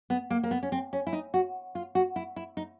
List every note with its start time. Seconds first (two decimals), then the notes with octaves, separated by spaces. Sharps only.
0.10 B3
0.31 A#3
0.43 A#3
0.51 B3
0.63 C#4
0.72 C4
0.93 C#4
1.07 E4
1.13 D#4
1.34 F#4
1.75 F4
1.95 F#4
2.16 E4
2.36 E4
2.57 D#4